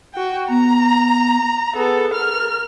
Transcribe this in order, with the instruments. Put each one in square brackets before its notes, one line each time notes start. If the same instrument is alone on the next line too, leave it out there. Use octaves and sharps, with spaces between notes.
[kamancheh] F#4 G5
[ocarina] B3 [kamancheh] A#5
[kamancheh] B3 A4 [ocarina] G#4
[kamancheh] A#4 F6